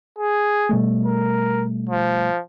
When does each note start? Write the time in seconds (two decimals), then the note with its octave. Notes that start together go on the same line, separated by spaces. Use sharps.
0.18 G#4
0.69 B2 G3 A3
1.06 A#4
1.89 F3